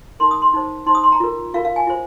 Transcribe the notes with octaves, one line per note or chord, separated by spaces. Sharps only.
D#4 A#4 C6
D#6
C6
D#4 C5
D#4 C5 C6
D#6
C6
A#5
F4 A#4
F4 A#4 F5
F5
G#5
F4 C5